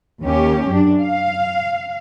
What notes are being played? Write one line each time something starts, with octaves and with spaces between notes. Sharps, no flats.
D#2 C#4 G4
F#2 D4
F5